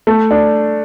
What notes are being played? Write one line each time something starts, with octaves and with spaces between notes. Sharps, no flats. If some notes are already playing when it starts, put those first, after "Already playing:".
A3
D4